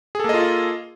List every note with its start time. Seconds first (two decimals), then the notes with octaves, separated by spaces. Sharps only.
0.15 G#4
0.20 A4
0.24 A#3
0.29 D#5
0.34 F4